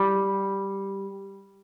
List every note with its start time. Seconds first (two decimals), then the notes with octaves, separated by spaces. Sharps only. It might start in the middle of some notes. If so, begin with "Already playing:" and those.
Already playing: G3